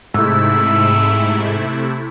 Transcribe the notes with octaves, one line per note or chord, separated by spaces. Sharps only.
G#2 C3 A3 E4 E6